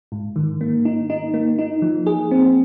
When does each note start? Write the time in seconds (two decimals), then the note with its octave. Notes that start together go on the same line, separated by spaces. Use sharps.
0.12 G#2
0.36 D#3
0.61 A#3
0.85 D#4
1.10 D#4
1.34 A#3
1.59 D#4
1.82 F3
2.06 G#4
2.31 C4